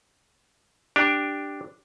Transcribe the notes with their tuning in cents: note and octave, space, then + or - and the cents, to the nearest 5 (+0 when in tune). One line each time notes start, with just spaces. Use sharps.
D4 +0 G4 +0